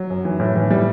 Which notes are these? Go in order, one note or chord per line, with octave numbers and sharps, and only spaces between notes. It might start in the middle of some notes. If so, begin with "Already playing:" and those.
Already playing: F#3
F#2
E3
A2
E3
A2 G3